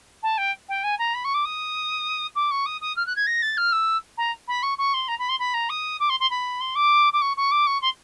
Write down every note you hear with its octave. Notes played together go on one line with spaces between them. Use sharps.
A5
G5
G5
G#5
A#5
B5
C#6
D6
D#6
D6
C#6
D#6
D#6
F6
F#6
G#6
A#6
A6
F6
E6
A#5
B5
C#6
C#6
C6
A#5
B5
C6
B5
A#5
D#6
D6
C6
C6
B5
C6
D6
D6
C#6
C#6
D6
C#6
C6